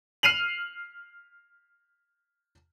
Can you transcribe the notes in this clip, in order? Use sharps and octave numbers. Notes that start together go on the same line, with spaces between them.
F6 C7 D#7 F7 F#7